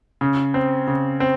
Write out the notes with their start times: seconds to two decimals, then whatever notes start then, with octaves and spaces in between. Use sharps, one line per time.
0.21 C#3
0.54 C4
0.87 C#3
1.20 C4